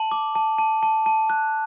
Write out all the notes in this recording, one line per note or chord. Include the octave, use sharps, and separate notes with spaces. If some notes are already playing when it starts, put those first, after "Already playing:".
Already playing: A5 F#7
D6
A5
A5
A5
A5
F#6